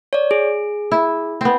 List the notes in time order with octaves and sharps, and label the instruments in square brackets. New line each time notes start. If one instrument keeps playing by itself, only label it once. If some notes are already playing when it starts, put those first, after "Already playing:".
[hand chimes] C#5 D5
G#4
[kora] E4
B3 C4